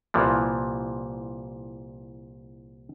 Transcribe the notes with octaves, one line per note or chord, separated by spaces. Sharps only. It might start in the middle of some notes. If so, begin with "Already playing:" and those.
C2 A#2 E3 F3